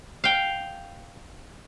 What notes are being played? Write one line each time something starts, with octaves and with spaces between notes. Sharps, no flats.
F5 G5